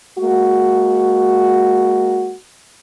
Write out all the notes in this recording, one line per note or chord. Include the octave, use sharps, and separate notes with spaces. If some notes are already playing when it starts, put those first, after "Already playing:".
G#3 A#3 F#4